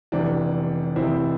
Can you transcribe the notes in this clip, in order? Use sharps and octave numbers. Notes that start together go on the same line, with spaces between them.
F1 E2 C3 E3 D4
F1 E2 C3 E3 C4 E4